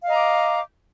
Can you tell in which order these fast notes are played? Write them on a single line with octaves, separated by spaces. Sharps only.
F5 D#5 A#5 D6